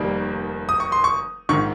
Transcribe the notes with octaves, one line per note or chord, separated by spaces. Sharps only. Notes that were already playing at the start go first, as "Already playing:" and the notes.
Already playing: F1 D#2 D#3 G3 A#3
D#6
C#6
C6
C#6
A#1 G#2 D#3 C#6